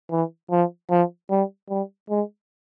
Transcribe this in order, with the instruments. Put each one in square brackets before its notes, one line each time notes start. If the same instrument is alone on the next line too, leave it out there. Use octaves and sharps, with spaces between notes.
[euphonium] E3
F3
F3
G3
G3
G#3